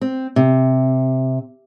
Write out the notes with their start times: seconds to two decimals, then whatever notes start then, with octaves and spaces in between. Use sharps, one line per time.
0.01 C4
0.36 C3